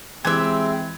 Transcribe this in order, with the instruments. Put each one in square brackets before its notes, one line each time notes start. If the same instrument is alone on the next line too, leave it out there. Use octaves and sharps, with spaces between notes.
[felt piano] E3 F#6 G#6 [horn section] G#3 C4 [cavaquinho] G4 E5